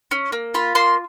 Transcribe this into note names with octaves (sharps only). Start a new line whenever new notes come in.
C#4
A#3
F4 B5
A#3 C6